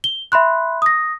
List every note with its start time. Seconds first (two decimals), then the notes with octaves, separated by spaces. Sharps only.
0.04 G7
0.32 E5 B5 C6 F#6
0.82 D#6 A#6